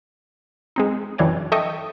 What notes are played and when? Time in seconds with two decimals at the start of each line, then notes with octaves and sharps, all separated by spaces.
0.76 G#3 C4 D#4
1.18 F#2 E3 D4 C#5 G5
1.52 A4 D#5 E5 G5 C#6 D#6